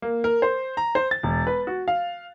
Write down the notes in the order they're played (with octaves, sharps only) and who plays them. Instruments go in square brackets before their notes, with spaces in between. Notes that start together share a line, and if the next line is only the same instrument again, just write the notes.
[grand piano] A#3
A#4
C5
A#5
C5
A6
E1
B4
F#4
F5